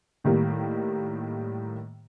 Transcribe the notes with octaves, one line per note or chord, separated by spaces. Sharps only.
A2 D#3 G3 A#3